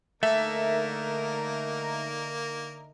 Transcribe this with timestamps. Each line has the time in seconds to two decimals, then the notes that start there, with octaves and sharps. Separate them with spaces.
0.23 D3 A3 A#3 D#4 A#4 E5